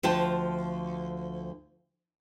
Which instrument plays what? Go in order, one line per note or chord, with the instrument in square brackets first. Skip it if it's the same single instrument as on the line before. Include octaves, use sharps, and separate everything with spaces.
[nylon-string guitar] D2 F3 G5 A5